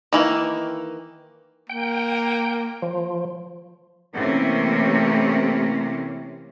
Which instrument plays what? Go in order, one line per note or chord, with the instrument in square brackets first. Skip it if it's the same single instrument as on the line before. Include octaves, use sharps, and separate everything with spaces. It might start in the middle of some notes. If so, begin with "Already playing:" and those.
[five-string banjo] D#3 E3 A#3
[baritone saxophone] A#3 [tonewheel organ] G5
[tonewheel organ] F3
[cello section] C3 E3 A3 A#3 C#4